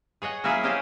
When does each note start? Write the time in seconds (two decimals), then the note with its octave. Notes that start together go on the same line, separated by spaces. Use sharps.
0.22 G#4 C#5 D#5 F#5
0.44 F#3 A#3 C#4 E4 G#4
0.63 A#3 C#4 G4 C5 D#5